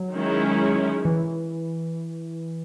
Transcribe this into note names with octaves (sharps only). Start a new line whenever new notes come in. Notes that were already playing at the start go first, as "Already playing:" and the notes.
Already playing: F#3
D#3 G#3 C#4 E4
E3